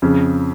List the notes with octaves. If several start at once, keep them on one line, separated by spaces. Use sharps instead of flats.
F2 C#3